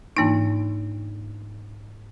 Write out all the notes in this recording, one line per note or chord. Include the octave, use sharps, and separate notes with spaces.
G#2 E3 A#3 D4 D#4